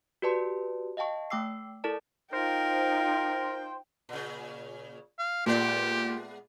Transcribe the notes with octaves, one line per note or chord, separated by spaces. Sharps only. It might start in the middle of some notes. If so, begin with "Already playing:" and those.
F#4 G4 B4 D5 A5 C6
D#5 F5 G5 A5 C#6
A3 G5 D6 E6 C7
E4 A4 A#4 D5 A5
D#4 F4 A#4 C5 G5
A#2 C#3
F5
A#2 G#3 B3 G4 D5